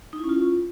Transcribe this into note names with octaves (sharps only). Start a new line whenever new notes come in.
D#4
E4
C#4
F4